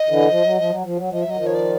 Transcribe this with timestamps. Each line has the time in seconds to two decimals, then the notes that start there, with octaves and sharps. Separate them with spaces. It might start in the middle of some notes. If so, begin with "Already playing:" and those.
Already playing: D#5
0.09 D3 E3
0.29 F3
0.44 F#3
0.57 F3
0.70 F#3
0.84 F3
0.96 F#3
1.10 F3 D#5
1.22 F#3 E5
1.30 D#5
1.36 D#3 F3
1.47 C#5
1.55 D5